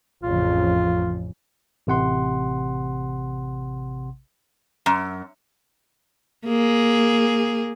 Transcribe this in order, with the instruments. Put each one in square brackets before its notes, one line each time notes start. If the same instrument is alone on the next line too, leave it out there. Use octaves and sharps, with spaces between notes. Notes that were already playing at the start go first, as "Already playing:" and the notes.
[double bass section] A1 F2 C#3 [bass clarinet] F4
[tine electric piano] A1 C3 F#5 C6
[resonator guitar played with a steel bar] F#2
[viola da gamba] A#3 G#4